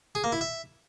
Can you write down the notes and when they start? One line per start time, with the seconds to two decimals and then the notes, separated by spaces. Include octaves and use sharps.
0.15 G#4
0.24 A#3
0.32 E4
0.41 E5